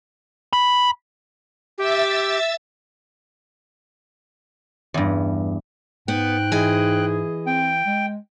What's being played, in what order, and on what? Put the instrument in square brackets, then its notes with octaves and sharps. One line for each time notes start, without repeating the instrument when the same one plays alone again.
[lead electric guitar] B5
[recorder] G4 [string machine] E5 E6 A6
[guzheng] E2 G2
[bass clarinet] G#2 [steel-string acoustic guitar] B3 [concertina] G5 F#6
[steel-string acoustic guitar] E3 D#5 G#5 [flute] G#4
[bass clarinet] C4 [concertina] G5
[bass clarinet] G#3